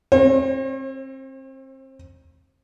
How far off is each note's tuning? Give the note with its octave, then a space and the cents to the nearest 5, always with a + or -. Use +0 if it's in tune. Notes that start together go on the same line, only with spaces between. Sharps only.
C4 +30 C#5 -45